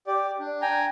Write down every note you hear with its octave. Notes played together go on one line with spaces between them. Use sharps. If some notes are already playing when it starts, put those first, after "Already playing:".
G4 D5
D4
G5 G#5 A#5